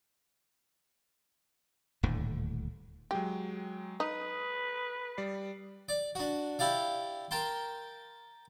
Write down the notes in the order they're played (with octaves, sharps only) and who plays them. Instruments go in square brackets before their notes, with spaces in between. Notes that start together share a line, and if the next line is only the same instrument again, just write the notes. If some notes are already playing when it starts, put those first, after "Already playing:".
[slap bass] D#1 D2 A2 D3
[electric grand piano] F#3 G#3 G5 [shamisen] G4
[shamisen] D#4 [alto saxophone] B4 [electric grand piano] D#6
[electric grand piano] G3 D5 C7
[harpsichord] D5
D4 F#4
E4 G4 D5 F5
A#4 G5 A5 C6